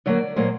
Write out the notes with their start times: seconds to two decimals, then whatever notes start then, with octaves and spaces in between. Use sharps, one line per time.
0.06 D3 F#3 A#3 D5
0.36 A#2 F#3 A#3 C5